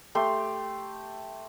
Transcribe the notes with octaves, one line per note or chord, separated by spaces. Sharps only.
A3 G4 C6